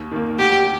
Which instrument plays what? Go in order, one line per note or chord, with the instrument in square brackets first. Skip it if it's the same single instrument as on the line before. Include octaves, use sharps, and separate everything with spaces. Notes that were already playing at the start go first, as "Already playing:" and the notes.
Already playing: [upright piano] D#2
D#3 A#3
[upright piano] D2 [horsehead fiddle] G4